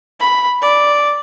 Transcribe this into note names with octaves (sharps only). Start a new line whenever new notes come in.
B5
D5